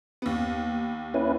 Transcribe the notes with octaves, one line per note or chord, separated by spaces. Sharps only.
D#2 B3
C#4 E4 B4